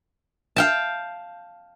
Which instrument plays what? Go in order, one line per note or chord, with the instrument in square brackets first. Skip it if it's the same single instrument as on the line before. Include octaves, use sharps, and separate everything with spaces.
[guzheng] F5 G5 A5